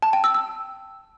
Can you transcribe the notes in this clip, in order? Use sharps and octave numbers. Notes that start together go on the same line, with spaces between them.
A5
G5
E6
E6